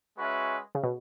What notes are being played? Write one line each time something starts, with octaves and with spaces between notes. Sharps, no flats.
G#3 C#4 F#4 B4 E5
C#3
B2